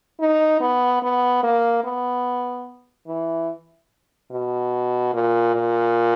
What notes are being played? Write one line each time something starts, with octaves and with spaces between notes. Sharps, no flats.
D#4
B3
B3
A#3
B3
E3
B2
A#2
A#2